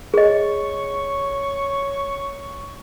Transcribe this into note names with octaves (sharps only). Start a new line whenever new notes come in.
G#4 C#5 D#5 C#6